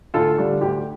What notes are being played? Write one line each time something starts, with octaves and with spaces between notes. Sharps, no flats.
D2 F4 A4
D3 G3 D4
D2 G4